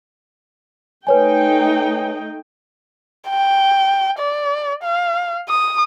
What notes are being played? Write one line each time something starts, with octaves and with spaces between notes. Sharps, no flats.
A3 D#4 B4 C#5 G5 G#5
G5
D5
F5
D#6